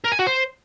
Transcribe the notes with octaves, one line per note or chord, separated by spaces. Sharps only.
A#4
G#5
F#4
C5